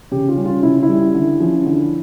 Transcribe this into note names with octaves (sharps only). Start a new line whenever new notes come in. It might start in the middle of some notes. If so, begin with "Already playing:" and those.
C#3 G4
F4
G3 C#4
F4
C#3 E4
E4
G3 C#4
D3
F3 C#4
D3